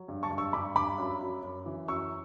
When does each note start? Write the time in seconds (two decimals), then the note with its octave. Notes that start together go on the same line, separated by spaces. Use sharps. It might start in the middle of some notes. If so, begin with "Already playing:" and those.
Already playing: F#3
0.08 G2
0.23 A5 C#6
0.30 G2
0.38 C#6 E6
0.53 G2 B5 D6
0.75 G2 B5 D6
0.98 F#2
1.21 F#2
1.43 F#2
1.66 E3
1.88 F#2 C#6 E6